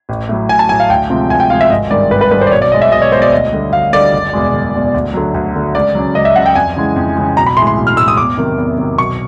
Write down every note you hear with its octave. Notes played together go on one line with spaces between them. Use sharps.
A1
A2 F#3
A1 G#5
A5
A2 F#3 G#5
F5
D2 G5
C3 F3 G#3
D2 G#5
G5
C3 F3 G#3 F5
E5
G#1 D#5
G2 D#3 G#3 D5
G#1 B4
B4
G2 D#3 G#3 B4
C5
D5
B1 C#5
D5
B2 G#3 D#5
E5
B1 D#5
C#5
B2 G#3 C5
D5
D2 D#5
D3 G3
D2 F5
D3 G3 D5
F#1
E2 B2 G#3
F#1
E2 B2 G#3
D2
D3 F#3
D2
D3 F#3
C#2 D5
C#3 F#3
C#2 D#5
E5
C#3 F#3 F#5
G5
F2 G#5
C#3 E3 G#3
F2
C#3 E3 G#3
B1 A#5
B5
A2 E3 G#3 C6
C6
B1
F6
A2 E3 G#3 E6
D#6
E2 D6
C3 D#3 F#3
E2
C3 D#3 F#3
B1 C#6